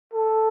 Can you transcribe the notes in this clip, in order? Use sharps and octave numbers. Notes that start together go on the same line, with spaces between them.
A4